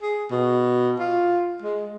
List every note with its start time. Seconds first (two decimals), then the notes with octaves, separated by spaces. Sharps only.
0.02 G#4
0.31 B2
0.99 F4
1.62 G#3